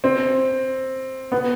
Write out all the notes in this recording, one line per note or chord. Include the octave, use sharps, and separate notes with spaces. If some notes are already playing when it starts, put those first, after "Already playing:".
C4
B3